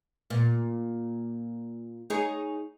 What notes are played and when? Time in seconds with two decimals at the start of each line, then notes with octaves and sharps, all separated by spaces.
0.30 A#2
2.10 D#4 G#4 C#5